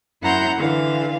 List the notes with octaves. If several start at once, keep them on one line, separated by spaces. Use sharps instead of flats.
F#2 E4 F#5 A#5 C6 G6
D3 E3 F5